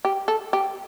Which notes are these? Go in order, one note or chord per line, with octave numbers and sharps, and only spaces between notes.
G4
A4
G4